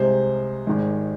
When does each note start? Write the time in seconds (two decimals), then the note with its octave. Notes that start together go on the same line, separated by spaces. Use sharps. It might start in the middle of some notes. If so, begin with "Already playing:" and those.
Already playing: C2 C3 G#3 C5
0.67 G#1 G#2 D#3 G#3